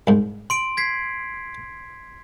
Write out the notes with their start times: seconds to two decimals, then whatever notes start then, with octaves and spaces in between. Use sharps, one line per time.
0.07 C2 G#2
0.50 C6 D7 F#7
0.77 G#6 B6 C7